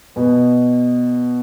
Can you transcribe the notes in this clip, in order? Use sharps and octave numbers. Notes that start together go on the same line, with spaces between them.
B2 B3